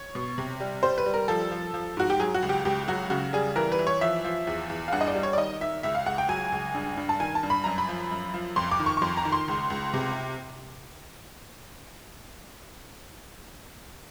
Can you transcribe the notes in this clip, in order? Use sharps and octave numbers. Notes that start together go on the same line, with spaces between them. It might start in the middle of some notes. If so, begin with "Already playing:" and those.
Already playing: C#5
B2
C3
G3
G3 C5
B4
G3
A#4
F3 A4
F3
F3
G#2 F#4
G4
F#3 G#4
F#4
C#2
G4
C#2 G4
F#3 F#4
C#3 F#4
G3 G#4
E3 A#4
B4
E3
C#5
F3 E5
F3
E2
E2
F5
G2 F#5
D#5
D5
G3
C#5
D5
D#3 D#5
D#3 E5
C#2 E5
F5
C#2 F#5
G5
F#3 G#5
C#2
G2
G2
A5
D#3 G#5
A5
G2
B5
F#2 A#5
B5
F3
F#2
F3
F2 C6
D6
D#3
C#6
C#6
F2 C6
A#5
D#3
C6
C#2
C#2
C3